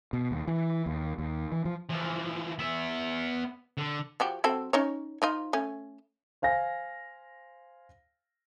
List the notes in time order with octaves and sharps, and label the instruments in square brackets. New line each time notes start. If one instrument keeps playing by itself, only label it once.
[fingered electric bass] B2
D#2
E3
D#2
D#2
E3
F3
[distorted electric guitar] E3 F3
B3 E5
D3
[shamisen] F3 F#4 G4
F#3 C4 A4
C#4 D#4 C#5
F3 D#4 F4
A3 C#4
[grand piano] C5 F5 G#5 A#6